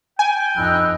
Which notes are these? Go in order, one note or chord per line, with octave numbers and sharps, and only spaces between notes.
G5 G#5
F2 D#4 B5 E6 F#6